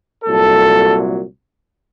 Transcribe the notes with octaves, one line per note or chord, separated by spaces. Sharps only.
C2 A#2 F#3 A4